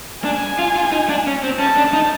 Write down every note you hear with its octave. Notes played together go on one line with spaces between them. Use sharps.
D4 G#5
F4
F4
D#4
D4
C#4
C4
C#4 A5
D4
D#4